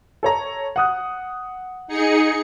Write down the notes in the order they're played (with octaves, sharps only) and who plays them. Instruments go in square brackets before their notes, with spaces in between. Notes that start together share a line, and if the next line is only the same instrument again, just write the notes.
[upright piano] A4 C#5 A#5
F#5 D#6 F#6
[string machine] D#4 G#4 C#7